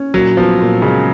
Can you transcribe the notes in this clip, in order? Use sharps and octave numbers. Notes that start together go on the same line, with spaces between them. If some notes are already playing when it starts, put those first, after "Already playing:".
Already playing: C#4
A#2 F#3
F3 B3
A#2
C#3 G#3